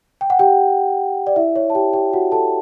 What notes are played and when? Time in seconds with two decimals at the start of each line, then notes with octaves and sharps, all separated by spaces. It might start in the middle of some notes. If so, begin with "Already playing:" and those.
0.21 G5
0.30 F#5
0.39 G4 G5
1.27 D5
1.36 E4 E5
1.56 C#5
1.70 A5
1.75 G4 G5
1.93 G4 G5
2.13 F#4 F#5
2.32 A4 A5